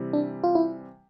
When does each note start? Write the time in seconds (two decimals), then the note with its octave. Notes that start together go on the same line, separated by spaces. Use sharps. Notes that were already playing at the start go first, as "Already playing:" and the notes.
Already playing: C3 E3 G3
0.13 D4
0.44 F4
0.55 E4